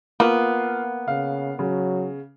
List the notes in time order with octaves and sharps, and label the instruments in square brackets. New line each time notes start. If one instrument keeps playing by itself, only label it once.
[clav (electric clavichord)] A#3 [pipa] B3 [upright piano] F4
[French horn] C#3 [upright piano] F5
[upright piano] C#3 [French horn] F#3